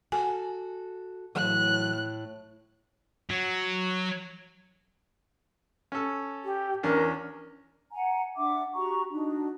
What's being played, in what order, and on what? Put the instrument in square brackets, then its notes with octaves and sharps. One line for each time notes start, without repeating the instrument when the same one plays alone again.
[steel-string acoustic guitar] F#4 A4 [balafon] G#5
[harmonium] A2 [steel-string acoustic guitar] E3 F#3 A3 [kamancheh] F#6
[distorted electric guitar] F#3
[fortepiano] C#4 A4
[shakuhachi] G4
[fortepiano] E2 C#4 D4 [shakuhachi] A#4
[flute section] F#5 G#5 A#5
D4 E5 F#5 D6
F#4 G4 A#5 C#6
D4 D#4 F#4